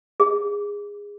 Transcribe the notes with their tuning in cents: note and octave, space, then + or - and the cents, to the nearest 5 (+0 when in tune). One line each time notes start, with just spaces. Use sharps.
G#4 -20